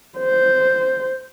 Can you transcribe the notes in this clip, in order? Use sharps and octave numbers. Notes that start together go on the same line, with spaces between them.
C5